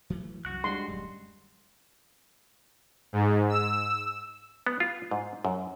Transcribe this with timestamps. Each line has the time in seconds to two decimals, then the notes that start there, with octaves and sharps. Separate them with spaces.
0.10 E3 F#3 A3
0.45 C2 F#2 F#4 F#6
0.64 G3 G#3 D4 C6
0.88 D1 F#2
3.13 G#2
3.49 E6
4.67 B3
4.80 F4
5.11 G#2
5.45 F#2